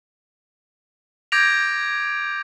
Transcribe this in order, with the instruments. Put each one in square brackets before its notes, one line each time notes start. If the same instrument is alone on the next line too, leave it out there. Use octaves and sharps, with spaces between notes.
[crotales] D6 G6 G#6 A#6 D7 F7